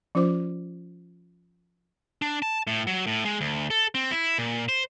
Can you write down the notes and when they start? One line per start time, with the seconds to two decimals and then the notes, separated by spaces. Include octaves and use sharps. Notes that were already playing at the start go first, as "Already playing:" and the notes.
0.15 F3 C#4 F4 C5 D6
2.22 D4
2.42 A5
2.67 A2
2.87 F#3
3.07 A2
3.25 G#3
3.41 D2
3.70 A4
3.95 C4
4.11 E4
4.38 A#2
4.69 C5